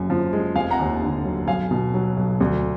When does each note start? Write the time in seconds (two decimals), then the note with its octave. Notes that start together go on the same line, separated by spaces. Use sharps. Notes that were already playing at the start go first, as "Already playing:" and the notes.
Already playing: F#1 F#2 G#5
0.10 F3
0.33 G#3
0.55 F1 F5 G#5
0.71 F#5 A#5
0.79 D#2
1.02 D3
1.25 F#3
1.48 B1 F5 G#5
1.71 B2
1.94 F#3
2.17 B1
2.40 D2